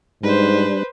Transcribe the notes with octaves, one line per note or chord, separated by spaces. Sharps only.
G#2 G3 D4 B4 C5